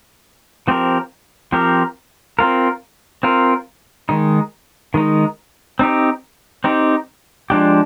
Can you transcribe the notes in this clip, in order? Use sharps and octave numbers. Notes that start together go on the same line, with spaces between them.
F3 C4 G4 A#4
F3 C4 G4 A#4
C4 F4 A#4
C4 F4 A#4
D#3 G#3 D#4
D#3 G#3 D#4
C4 D#4 G4
C4 D#4 G4
F3 G#3 D4 G4